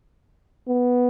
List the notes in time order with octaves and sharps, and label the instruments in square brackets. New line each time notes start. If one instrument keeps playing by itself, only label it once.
[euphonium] B3